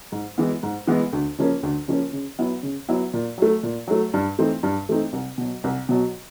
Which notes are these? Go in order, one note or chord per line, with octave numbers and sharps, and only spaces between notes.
G#2
E3 G#3 B3
G#2
E3 G#3 B3
D2
C#3 F3 A#3 C#4
D2
C#3 F3 A#3 C#4
C#3
F#3 B3 E4
C#3
F#3 B3 E4
A#2
F#3 A3
A#2
F#3 A3
G2
E3 A3 C4 D#4
G2
E3 A3 C4 D#4
C2
B2 F#3
C2
B2 F#3